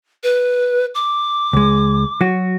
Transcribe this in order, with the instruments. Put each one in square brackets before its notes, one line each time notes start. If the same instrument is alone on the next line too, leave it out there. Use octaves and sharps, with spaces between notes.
[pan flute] B4
D6
[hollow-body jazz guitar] C#2 G#3
F#3 F#4